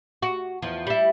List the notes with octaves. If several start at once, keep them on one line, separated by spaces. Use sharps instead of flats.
F#4
E2 F3
G3 E4